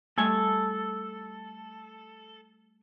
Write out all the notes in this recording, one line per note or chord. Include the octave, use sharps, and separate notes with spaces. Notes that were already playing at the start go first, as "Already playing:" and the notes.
G3 A3 A4 G#5